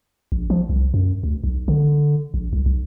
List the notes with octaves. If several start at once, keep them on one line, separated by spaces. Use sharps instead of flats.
A#1
F3
C2
F#2
D2
B1
D3
A#1
C2
B1